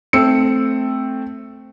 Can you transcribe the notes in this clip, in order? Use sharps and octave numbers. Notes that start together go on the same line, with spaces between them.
A3 C4 E6 C#7